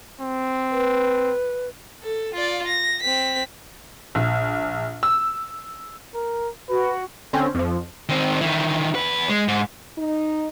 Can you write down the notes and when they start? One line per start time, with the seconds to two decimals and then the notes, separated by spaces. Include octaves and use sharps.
0.21 C4
0.71 B4
2.03 A4
2.34 F4 D5
2.67 A#6
3.03 C4 B6
4.15 A#1
5.03 E6
6.15 A#4
6.69 F#4 B4
7.33 D3 C4 C#4
7.55 F2 F3
8.09 D#3 C4
8.41 D#3 E3
8.95 E2 B4
9.29 G#3
9.48 G#2
9.97 D#4